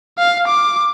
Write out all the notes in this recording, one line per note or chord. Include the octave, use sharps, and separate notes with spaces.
F5
D6